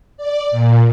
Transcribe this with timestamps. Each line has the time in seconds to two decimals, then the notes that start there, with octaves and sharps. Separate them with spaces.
0.17 D5
0.51 A#2